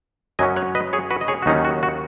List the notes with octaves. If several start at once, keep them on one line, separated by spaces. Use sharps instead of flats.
F#2 F#3 C#4 D#5 G#5
C#5 F#5
B4 D#5
G#4 C#5
F#4 B4
D#5
G#4 C#5
F#4
D#2 D#3 F#3 C#4 D#4
F#4
F#4